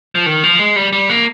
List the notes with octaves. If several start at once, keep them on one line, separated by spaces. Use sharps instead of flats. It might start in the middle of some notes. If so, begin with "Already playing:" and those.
F3
D#3
F3
G#3
G3
G3
A#3